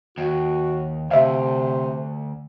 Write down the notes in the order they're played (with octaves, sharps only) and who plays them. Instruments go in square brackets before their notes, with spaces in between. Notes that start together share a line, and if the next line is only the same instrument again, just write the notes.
[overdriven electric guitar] D#2 [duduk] F#4
[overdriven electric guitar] D2 [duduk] C3 [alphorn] C5 [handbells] E5 F5